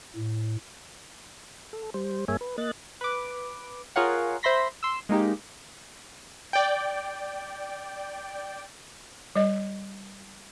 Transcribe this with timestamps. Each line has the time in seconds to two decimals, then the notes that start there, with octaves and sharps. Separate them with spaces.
0.16 A2
1.73 A4
1.94 G3 C5
2.28 G2 A#3 G#4 C#5 E5 G#5
2.41 B4
2.58 A#3 D#5 F#6 A6
3.01 B4 D6
3.96 F4 G#4 A#4 C#5 F5 F#5
4.43 C5 E5 B5 C6 A#6 B6
4.83 C6 E6
5.09 G#3 A#3 D#4 G4
6.53 D5 G5
9.35 G3 D#5